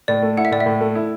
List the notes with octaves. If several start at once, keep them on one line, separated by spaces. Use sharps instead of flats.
A2 D5
A3
E4 F#5
E5
A2 D5
E5
A2
A3
E4